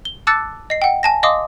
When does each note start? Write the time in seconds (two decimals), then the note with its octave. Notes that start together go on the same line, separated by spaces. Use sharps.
0.05 G7
0.27 A5 D6 E6 F#6 A6 C#7
0.70 D#5 C7
0.82 F#5 G5
1.03 G#5 A5 A#6
1.23 D#5 F5 C6 D6 D#6